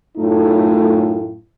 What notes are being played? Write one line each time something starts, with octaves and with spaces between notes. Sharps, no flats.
F#2 A2 A3 D#4 F4